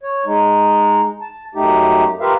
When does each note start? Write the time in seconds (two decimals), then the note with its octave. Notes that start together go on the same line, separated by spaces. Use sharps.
0.03 C#5
0.26 G#3 D#4
1.21 A5
1.55 F#2 A3 D#4 G4
2.21 F4 G4 A#4 B4 E5 F5